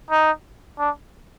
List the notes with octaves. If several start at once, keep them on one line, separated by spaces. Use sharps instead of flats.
D#4
D4